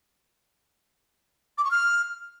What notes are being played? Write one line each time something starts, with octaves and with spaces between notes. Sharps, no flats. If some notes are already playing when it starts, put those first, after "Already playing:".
D6
C#6
F6